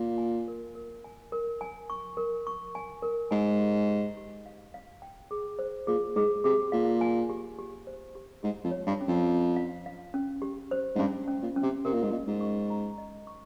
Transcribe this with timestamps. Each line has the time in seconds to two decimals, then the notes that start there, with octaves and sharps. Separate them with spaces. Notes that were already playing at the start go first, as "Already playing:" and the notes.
Already playing: A#2 F5
0.18 G#5
0.48 A#4
0.75 A#4
1.04 G#5
1.32 A#4
1.61 G#5
1.90 C#6
2.17 A#4
2.47 C#6
2.75 G#5
3.02 A#4
3.31 G#2 G#5
3.60 G4
3.88 G4
4.17 G4
4.46 F5
4.74 F5
5.02 G5
5.31 G#4
5.59 C5
5.87 A#2 G#4
6.15 G#2 G#4
6.44 C3 G#4
6.72 A#2 F5
7.01 G#5
7.29 G4
7.59 G4
7.87 C5
8.15 G4
8.43 G#2 G4
8.64 F2
8.71 C#5
8.87 G2
9.01 C#4
9.08 F2
9.28 C#4
9.56 F5
9.86 F5
10.14 C#4
10.42 G4
10.71 C5
10.95 G#2
10.99 G2 C#4
11.28 C#4
11.42 A#2
11.56 C#4
11.63 C3
11.85 C3 A#4
11.94 A#2
12.02 G#2
12.11 A#2 D#5
12.27 G#2
12.41 C#6
12.70 A#5
12.98 D#5
13.27 C#6